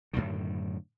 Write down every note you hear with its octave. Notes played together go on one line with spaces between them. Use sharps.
F#2 A2 D3 D#3